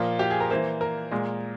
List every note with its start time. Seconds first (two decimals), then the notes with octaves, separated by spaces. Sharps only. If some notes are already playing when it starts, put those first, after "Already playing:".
Already playing: A#2 F3 A#3 F4
0.19 G4
0.30 G#4
0.40 A#4
0.50 E3 A#3 C5
0.81 A#4
1.11 A#2 G#3